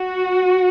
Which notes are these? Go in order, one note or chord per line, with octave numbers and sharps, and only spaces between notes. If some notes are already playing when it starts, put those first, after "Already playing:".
Already playing: F#4